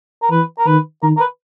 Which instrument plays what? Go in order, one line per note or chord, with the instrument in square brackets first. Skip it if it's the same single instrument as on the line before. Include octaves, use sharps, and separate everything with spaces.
[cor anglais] A#4
[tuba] E3 [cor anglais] B4
[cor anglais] A#4
[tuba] D#3 [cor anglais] B4
[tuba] D#3 [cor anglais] A#4
[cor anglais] A#4
B4